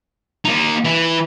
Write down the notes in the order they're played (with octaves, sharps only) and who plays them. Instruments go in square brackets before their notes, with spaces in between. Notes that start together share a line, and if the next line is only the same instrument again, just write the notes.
[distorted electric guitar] A#3 D#4
E3